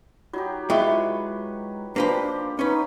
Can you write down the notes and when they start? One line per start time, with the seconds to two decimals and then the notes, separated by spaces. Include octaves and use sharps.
0.33 F#3 D#4 F4 G4
0.70 G#3 E4 F4 B4 E5 G5 C#6
1.96 F3 A#3 D4 G4 B4 C5
2.59 C#4 D#4 B4 C#5 G5 C6